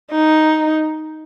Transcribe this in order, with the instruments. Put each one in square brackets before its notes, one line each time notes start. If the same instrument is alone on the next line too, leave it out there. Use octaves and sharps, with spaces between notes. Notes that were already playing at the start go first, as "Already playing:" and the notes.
[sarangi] D#4